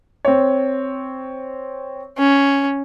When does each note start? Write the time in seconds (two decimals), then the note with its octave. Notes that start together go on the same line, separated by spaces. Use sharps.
0.25 C4 C#5
2.18 C#4